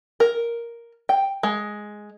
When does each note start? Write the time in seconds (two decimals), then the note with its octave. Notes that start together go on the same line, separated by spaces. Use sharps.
0.20 A#4
1.09 G5
1.43 G#3